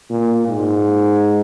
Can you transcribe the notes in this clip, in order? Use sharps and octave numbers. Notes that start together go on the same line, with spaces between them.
A#2
G#2